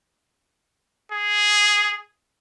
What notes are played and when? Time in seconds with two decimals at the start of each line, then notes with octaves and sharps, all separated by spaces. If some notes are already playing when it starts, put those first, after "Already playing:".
1.12 G#4